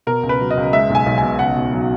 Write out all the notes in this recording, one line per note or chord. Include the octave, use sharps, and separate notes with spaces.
B2 A#4
C#2
B4
F#3
D#5
C#2
G#3 E5
B1 G#5
B1
B2 G#5
C#2 F#5
B2
F#3